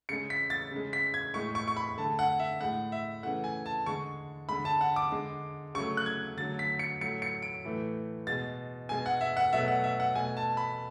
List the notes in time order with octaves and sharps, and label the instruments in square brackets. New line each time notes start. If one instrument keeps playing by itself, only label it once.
[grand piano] C#3 G#3 C#7
B6
A6
C#3 G#3
B6
G#6
A2 G#3 C#6
C#6
C#6
B5
D3 A3 A5
F#5
E5
A2 G#3 F#5
E5
C#3 E3 A3 F#5
G#5
A5
D3 G#3 C#6
D3 G#3 B5
A5
F#5
D6
D3 G#3
C#3 F#3 A3 C#6
F#6
G#6
D3 F#3 A3 A6
B6
C#7
A2 F#3 A3 C#7
C#7
D7
A2 E3 A3
B2 G#3 A6
B2 G#3 G#5
F#5
E5
F#5
B2 F#3 A3 E5
F#5
E5
F#5
B2 A3 G#5
A5
B5